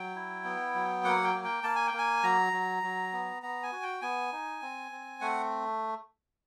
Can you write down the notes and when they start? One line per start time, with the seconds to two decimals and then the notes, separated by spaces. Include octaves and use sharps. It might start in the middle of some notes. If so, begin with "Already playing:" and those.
Already playing: F#3 G5
0.15 E4
0.45 B3
0.75 F#3
1.04 A#3 F#5
1.24 G5
1.34 A#3
1.45 G5
1.63 A#3 A5
1.76 G#5
1.87 G5
1.94 A#3
1.99 G#5
2.23 F#3 A#5
2.53 F#3
2.83 F#3
3.13 B3
3.43 B3 A#5
3.63 G#5
3.72 F#4
3.83 G5
4.02 B3 G#5
4.32 D#4
4.62 C4
4.91 C4
5.21 A3 F#5